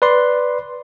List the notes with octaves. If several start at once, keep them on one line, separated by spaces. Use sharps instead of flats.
B4 D5 C6